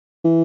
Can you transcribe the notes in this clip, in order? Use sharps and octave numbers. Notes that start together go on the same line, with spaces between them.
E3